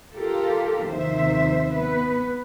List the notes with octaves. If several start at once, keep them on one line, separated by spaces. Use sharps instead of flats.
F4 G4 A4 A#4
D#2 C3 D#3 F3 C5 E5
B3 B4